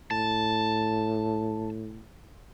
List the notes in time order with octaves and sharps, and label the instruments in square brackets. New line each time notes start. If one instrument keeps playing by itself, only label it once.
[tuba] A2 [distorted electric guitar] A5